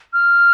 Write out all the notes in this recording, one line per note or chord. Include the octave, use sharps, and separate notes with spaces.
F6